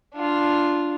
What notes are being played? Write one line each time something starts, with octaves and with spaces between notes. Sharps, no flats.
D4 F4